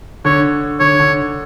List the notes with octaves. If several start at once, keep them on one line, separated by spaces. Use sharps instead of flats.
D3 C#5
D3 C#5
D3